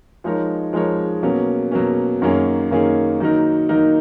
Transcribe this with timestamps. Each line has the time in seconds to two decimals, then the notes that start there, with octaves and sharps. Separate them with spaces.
0.24 F3 G#3 D#4 A#4 C#5
0.73 F3 G#3 D#4 A#4 C#5
1.23 B2 F#3 A#3 C#4
1.71 B2 F#3 A#3 C#4
2.22 F#2 D#3 A#3 C#4 G#4
2.71 F#2 D#3 A#3 C#4 G#4
3.20 D#3 F#3 A#3 D#4 A#4
3.69 D#3 F#3 A#3 D#4 A#4